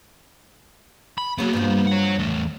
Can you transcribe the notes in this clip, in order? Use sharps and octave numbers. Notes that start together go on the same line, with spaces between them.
B5
C#3 F#3 A#3 B3
G2 F3
C#5 F#5
E2 A3